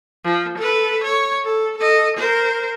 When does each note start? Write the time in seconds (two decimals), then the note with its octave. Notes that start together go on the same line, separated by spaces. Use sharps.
0.25 F3
0.58 A4 B4
1.03 C#5
1.44 A4
1.78 A4 D#5
2.17 A#4 C5